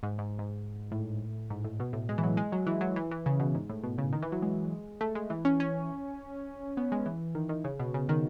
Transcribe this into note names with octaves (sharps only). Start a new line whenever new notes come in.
G#2
G#2
G#2
A2
G#2
A2
B2
A2
G#3
E3
F#3
G#3
F#3
E3
F#3
E3
E3
C#3
B2
G#2
A2
B2
C#3
D#3
E3
F#3
G#3
A3
G#3
E3
C#4
C#4
B3
G#3
E3
D#3
D#3
C#3
B2
C#3
D#3